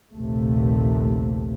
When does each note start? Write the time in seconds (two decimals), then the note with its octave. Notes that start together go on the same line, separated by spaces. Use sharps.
0.13 A#1 D#2 C3 A3